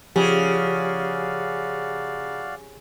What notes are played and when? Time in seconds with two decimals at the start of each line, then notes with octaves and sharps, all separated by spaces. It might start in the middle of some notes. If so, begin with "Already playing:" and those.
0.16 C#3 F3 F#4 G4 D5 F5